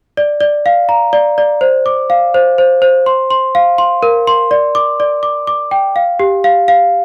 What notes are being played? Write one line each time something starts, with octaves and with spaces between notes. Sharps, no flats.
D5
D5
F5
A#5
D5
D5
C5
D6
F5
C5
C5
C5
C6
C6
F5
C6
A#4
C6
D5
D6
D5
D6
D6
G5
F5
G4
F5
F5